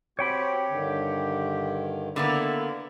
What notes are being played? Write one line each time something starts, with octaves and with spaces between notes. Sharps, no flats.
C4 F#4 G4 C#5 G5 B5
G2 D3 D#3
D3 A#3 B3 E4